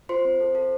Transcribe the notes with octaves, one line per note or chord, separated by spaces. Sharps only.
F4 C5 C6
C4
A4
A4